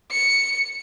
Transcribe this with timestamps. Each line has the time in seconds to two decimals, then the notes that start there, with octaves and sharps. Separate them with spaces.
0.11 C#7